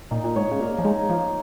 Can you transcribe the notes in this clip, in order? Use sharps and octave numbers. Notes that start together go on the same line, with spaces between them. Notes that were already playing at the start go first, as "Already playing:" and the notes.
A#2 D#4
A#2
G#2 C#5
C#3
A#2 A#3
F3
G#3 D#4
F3 A#3